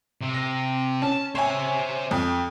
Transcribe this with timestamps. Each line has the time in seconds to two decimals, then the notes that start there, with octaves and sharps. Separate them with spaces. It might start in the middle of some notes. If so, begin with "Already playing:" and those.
0.21 C3
0.34 A#6
1.02 C#4 A5
1.35 C5 C#5 E5 G#5
2.11 F2